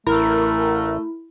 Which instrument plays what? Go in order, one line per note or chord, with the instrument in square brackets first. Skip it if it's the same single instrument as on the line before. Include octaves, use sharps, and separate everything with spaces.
[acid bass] A1 [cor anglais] A3 [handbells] E4 [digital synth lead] A#4